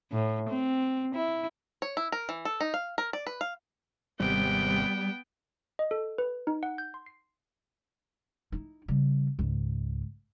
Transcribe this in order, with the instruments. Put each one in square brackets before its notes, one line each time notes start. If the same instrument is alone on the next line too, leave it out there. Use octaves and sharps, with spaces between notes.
[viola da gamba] A2
C4
E4
[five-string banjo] C#5
E4
A#4
E3
A4
D#4
F5
A#4
D5
B4
F5
[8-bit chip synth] G#1 C3 [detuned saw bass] G3 [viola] B3 G5
[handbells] D#5
A4
B4
D#4
F#5
G6
C6
C7
[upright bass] D#4 E4
C#3 G3
C#2 G#2